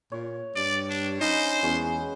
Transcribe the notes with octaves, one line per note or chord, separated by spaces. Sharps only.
A#2 C#5
G2 D5
D4
C#4 D#4 B4 C5 F5
E2 G#3 C#4 F#4